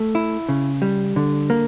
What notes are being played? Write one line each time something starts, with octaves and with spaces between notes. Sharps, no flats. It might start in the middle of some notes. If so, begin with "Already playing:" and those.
Already playing: A3
E4
C#3
G3
D3
A#3